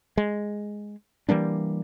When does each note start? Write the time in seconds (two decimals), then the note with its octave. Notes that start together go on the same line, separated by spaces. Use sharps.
0.17 G#3
1.29 E3 G3 A#3 D4